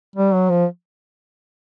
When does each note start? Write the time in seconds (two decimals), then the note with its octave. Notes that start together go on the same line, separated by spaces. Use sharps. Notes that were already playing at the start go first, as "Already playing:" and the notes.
0.16 G3
0.33 F#3
0.50 F3